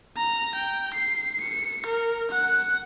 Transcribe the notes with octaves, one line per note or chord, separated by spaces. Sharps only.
A#5
G5
C7
C#7
A#4
F#5